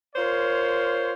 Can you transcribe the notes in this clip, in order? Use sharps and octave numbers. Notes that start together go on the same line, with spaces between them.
F4 A#4 C5 C#5